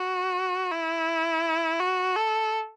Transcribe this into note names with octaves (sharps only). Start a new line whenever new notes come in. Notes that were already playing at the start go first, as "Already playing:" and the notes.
Already playing: F#4
E4
F#4
A4